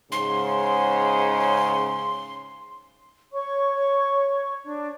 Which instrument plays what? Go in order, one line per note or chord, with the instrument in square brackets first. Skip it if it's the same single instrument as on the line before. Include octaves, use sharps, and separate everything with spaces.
[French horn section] G#2 C#3 [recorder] C6
[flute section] C#5 C#6
D4